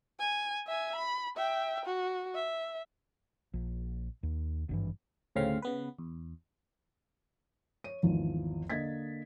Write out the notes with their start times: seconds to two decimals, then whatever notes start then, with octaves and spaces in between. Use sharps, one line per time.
0.19 G#5
0.67 E5 G#5
0.96 B5
1.37 E5 G5
1.86 F#4
2.35 E5
3.54 A#1
4.23 D#2
4.69 G#1 G2 E3
5.36 D2 A2 C#3 C4 F5
5.62 C#3 B3 B4
5.99 E2
7.84 C#5 D#7
8.03 G#1 E2 F3
8.70 D3 A#3 D#5 G#6 A6 B6